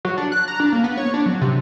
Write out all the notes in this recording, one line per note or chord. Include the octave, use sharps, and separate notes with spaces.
F#3
D4
F#6
A#5
D4
A#3
B3
C#5
D4
F#3
C3